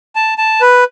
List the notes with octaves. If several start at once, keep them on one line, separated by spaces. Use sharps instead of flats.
A5
A5
B4